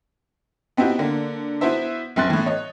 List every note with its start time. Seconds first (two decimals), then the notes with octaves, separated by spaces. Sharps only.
0.77 B3 C4 D#4 E4 F#4 G4
0.99 D3 A#3
1.61 B3 E4 F#4 C5 E5
2.16 A#1 F#2 C4 C6 F#6 A6
2.30 A2 E3
2.46 C#5 D#5